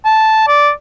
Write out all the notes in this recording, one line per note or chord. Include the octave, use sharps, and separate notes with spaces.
A5
D5